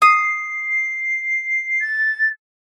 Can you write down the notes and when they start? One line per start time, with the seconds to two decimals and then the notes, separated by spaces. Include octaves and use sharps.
0.02 D#6 C7
1.81 A6